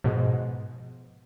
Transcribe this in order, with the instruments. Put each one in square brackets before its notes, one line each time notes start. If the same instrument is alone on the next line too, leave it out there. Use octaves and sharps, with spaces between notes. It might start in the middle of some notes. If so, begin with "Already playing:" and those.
[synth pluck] G#2 B2 F3